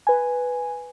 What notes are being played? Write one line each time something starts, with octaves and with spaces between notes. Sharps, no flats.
B4 G#5